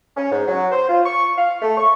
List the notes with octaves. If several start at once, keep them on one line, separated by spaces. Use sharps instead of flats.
C#4
G#2
F#3
C5
F4
C#6
F5
A3
C#6